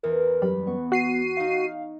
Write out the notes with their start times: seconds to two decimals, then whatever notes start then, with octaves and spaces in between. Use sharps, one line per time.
0.03 E2 E3 A#4
0.42 F#2 G3 B5
0.67 B3 C#6
0.92 F#4 C7 D#7
1.37 D#4 F5 C#6